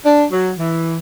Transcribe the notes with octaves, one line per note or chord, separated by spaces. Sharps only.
D4
F#3
E3